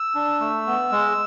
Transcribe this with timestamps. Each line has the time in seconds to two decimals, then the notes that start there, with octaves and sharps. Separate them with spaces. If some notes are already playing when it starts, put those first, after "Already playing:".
Already playing: E6
0.15 D4
0.40 A3
0.67 B3
0.92 G#3